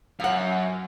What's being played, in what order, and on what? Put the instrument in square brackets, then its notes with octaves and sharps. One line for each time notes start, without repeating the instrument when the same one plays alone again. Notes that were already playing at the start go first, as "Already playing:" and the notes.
[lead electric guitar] F#2 [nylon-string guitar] F5 F#5